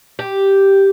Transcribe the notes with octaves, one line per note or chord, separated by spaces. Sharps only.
G4